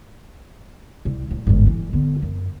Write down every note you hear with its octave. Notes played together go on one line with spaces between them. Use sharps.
C2
D1 C2
G1 G#2
E3
D3 B3
F#2